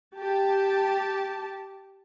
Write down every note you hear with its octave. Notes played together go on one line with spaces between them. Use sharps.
G4 A5